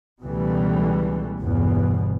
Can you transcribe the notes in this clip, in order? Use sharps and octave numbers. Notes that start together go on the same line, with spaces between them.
C#2 B2 E3 G3 A3
G1 E2 B2